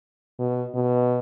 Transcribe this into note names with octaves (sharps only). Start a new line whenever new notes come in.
B2
B2